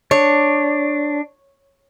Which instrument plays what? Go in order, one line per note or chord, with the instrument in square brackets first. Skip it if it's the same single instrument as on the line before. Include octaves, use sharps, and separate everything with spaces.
[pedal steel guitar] D4 [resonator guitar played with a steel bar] C#5